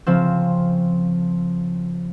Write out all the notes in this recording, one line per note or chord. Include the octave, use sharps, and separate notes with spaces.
C#3 F3 C4